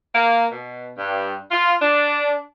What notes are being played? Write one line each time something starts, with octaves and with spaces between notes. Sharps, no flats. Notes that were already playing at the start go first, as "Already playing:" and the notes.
A#3
B2
G2
F4
D4